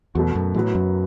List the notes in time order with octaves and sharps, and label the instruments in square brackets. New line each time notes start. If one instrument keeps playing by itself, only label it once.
[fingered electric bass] E2 [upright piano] B2 F#3 A3 F#4
[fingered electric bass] F#2
[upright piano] F#1 F#2 F#3 B3 [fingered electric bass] A2
[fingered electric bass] F#2